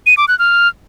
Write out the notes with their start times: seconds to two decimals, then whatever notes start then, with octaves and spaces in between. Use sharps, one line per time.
0.06 D#7
0.17 D6
0.28 F#6
0.39 F6